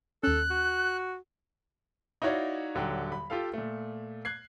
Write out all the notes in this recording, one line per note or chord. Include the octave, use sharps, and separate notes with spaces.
D#2 C#4 A4 F#6
F#4
D#4 E4 F#4 C#5 D5 F5
D#1 D3 F#3 G5
B5
F4 G4 A4 F5
A#2 A3
F#6 G#6 C7